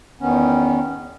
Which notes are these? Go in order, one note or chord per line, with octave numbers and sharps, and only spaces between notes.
E2 D#3 B3 C#4